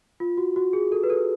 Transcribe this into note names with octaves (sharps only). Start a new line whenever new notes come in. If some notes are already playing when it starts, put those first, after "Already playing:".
F4
F#4
F#4
G#4
A4
B4
A4